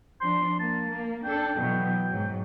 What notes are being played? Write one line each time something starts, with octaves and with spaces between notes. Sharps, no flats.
F3 D4 C6
A#3 A5
A#3
D4 A4 G5
B2 E3 F#3
G#2 F#3